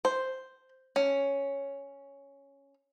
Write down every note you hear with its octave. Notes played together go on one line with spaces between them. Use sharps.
C5
C#4